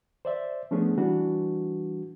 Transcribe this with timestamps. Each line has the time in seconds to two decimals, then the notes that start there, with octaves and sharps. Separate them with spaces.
0.25 C5 D5 E5
0.71 F3 A3 B3 C#4 D4 G#4
0.98 E3 G3 D4 F#4